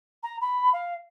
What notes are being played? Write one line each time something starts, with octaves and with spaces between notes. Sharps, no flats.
A#5
B5
F5